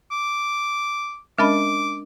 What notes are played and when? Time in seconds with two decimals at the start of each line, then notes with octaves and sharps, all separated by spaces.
0.11 D6
1.38 G#3 C#4 D4 A#4 D#5 B5 D6